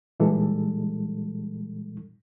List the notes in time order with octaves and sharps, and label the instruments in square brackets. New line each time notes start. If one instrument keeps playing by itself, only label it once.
[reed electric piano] A#2 D#3 E3 G3 G#3 A4